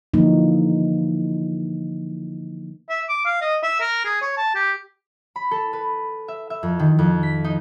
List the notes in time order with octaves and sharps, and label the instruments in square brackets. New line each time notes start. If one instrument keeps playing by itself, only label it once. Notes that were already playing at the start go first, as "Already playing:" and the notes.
[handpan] D3 E3 F3 A#3 D#4
[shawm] E5
D6
F5
D#5
E5
A#4
G#4
C#5
A5
G4
[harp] B5
A4
B4
E5
E5
F2
D#3
F2
B6
D#4